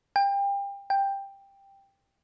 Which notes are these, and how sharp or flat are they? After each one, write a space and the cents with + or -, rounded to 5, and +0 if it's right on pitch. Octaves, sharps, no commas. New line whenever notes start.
G5 +30
G5 +10